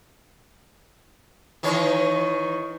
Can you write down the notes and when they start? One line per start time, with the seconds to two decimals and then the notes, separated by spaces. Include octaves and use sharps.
1.63 D#3 E3 C#5